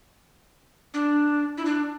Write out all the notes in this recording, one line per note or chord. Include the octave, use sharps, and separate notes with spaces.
D4
E4
D4